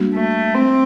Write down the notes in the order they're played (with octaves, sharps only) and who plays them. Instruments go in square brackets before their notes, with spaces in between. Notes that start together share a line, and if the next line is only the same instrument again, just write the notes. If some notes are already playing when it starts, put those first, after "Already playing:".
Already playing: [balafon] G3 A#3 D4 F#4
[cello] A3
C4